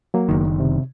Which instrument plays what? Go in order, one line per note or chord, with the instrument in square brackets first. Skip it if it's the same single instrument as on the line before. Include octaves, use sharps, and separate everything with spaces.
[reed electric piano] F#3 A#3
[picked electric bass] F#1 D#3
[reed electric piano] C3